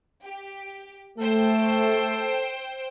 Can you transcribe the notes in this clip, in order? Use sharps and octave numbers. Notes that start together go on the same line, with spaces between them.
G4
A3 A4 C5 G5 E6